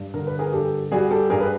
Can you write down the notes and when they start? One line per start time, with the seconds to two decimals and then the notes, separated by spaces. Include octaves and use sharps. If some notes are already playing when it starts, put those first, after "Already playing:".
Already playing: G2
0.14 D3 A#4
0.27 B4
0.39 G#4 A#4
0.52 G2 G4 A4
0.91 G3 F#4 G#4
1.11 G4 A4
1.30 G2 G#4 A#4
1.40 B4